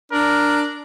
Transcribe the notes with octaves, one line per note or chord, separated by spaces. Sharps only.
D4 A#4